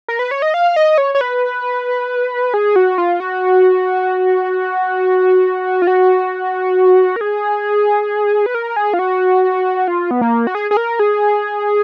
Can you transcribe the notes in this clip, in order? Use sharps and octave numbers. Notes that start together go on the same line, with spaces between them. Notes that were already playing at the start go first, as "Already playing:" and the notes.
A#4
B4
C#5
D#5
F5
D#5
C#5
C#5
B4
G#4
F#4
F4
F#4
F4
F#4
A#4
G#4
B4
A#4
G#4
F4
F#4
F4
B3
A#3
F#4
G#4
G#4
A#4
G#4